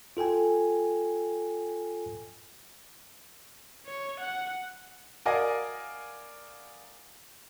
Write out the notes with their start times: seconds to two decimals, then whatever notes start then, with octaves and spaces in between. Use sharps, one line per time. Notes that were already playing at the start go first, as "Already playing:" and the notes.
0.17 F4 A4 G5 G#5
3.86 C#5
4.20 F#5
5.25 F#4 A#4 D5 D#5 F5 G#5